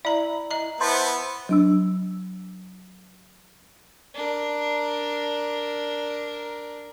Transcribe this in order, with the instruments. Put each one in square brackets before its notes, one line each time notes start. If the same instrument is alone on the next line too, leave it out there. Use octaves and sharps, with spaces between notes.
[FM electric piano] E4 [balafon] D5 A#5
[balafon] D#5 A#5
[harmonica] B3 E4 [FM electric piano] C5 A5 B5
[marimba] F#3 D4 E6
[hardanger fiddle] D4 A#4